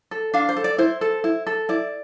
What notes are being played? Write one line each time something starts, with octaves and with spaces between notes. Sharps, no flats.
A4
D4 F5
C5
A4
D5
E4 C5
A4
E4
A4
E4 D5